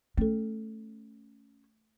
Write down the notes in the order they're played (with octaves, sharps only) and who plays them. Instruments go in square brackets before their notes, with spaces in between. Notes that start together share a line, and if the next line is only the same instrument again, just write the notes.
[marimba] A3 A4 [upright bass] C#4